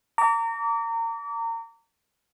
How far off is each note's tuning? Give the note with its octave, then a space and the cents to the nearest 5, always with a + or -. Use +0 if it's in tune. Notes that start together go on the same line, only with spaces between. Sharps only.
A#5 -30 D6 -35